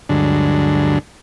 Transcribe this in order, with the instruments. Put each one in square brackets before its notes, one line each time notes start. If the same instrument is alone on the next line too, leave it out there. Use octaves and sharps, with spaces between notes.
[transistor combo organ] D2 G2 D3 F#3 G#3 D4